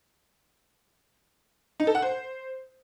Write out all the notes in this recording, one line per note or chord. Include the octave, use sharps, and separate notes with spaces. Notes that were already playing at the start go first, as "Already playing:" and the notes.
D#4
A4
F#5
C5